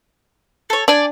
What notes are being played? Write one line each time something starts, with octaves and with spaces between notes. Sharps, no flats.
A4 C#5
D4 D5 G#5